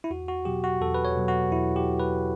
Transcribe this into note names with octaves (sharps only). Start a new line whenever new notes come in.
E4
E2 F#4
F#4
B2 F#3 G4
F#4
E2 A4
B4
C#5
B2 F#3
F#4
E2 E4
G4
B2 F#3
B4